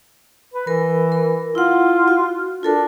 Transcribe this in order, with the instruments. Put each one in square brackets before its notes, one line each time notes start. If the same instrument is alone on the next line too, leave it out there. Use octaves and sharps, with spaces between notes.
[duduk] B4
[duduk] E3 [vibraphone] A#4
[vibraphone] A#4
[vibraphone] E4 F#5 [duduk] F4
[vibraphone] F#4
[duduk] D4 [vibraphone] F4 A4 A#4